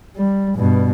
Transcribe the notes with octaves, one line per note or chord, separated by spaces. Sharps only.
G3
G2 B2